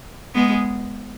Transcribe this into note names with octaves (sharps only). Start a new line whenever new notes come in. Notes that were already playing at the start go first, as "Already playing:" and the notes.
G#3 B3